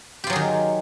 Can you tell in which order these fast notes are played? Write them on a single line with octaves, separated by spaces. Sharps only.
G4 F4 F#3 G#4 D#3